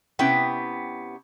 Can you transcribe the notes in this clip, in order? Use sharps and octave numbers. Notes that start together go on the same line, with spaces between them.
C3 B3 C#4 E4 G5